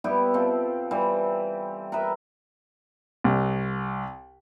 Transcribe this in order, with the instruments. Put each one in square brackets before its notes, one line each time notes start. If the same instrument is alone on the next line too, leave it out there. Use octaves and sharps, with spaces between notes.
[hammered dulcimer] G3 B3 E4 G4
B2 C4 F4 A4
E3 G3 C4
A#4 B4 E5
[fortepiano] C2